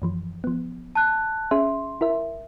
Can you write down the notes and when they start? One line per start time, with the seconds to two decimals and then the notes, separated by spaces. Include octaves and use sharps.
0.02 F#2 E3 F3
0.44 F3 B3
0.95 A5 F#6
1.51 C#4 G#4 E5 C6
2.01 E4 A#4 E5